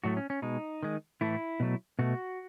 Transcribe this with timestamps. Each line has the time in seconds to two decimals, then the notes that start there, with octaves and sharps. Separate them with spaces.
0.04 A2 F#3 A3 F#4
0.17 C#4
0.30 C#4
0.42 B2 G#3 D#4
0.83 D#3 G#3
1.21 A2 E3 A3 E4
1.60 B2 F#3 A3
1.99 B2 A3 F#4